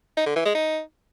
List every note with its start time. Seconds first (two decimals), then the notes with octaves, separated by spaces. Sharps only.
0.17 D#4
0.26 D3
0.36 E3
0.45 G#3
0.55 D#4